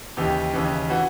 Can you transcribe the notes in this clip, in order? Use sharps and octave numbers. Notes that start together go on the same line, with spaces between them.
D#2 C#3 E3 G4
D#2 C#3 E3
E3 F#4